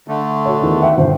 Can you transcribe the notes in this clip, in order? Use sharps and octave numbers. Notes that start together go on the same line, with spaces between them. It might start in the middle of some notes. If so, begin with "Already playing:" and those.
D3 A3
F#4 C#5
E2 D#3 E3
E5 F#5 G5
G1 C5